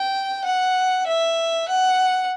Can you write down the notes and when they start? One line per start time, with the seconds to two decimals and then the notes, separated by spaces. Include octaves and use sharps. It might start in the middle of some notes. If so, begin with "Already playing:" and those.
Already playing: G5
0.44 F#5
1.06 E5
1.68 F#5